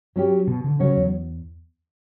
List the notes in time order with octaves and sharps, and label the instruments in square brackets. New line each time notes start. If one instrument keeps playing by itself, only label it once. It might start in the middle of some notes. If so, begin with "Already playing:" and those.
[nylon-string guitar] F#3 C#4 G4
[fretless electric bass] B2
D3
[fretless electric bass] C#3 [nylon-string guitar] F#3 C#4 F#4 C#5
[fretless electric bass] E2